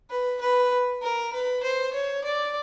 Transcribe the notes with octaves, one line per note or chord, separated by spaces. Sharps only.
B4
B4
A#4
B4
C5
C#5
D5